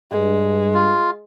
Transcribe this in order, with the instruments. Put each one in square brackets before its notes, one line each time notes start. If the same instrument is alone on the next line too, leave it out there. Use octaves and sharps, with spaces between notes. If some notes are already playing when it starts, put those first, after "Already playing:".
[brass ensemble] G2 [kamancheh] G#3
[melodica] F4